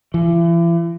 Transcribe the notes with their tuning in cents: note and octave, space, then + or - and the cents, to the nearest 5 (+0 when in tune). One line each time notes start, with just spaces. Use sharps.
E3 +40